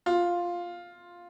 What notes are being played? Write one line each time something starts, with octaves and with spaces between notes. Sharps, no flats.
F4